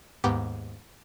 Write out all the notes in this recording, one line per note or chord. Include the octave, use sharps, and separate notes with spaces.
D#2 G#2 B3 G4